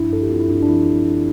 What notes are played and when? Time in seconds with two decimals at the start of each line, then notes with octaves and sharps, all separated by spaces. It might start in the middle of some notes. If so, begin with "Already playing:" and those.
Already playing: G2 F3 D4 E4
0.11 G2 A4
0.22 G4
0.30 C4 F4
0.40 E4
0.49 G2 D4
0.63 D4
0.69 F3 E4
0.87 G2
1.07 G2